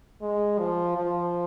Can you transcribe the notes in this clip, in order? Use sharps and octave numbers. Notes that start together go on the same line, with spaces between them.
G#3
F3
F3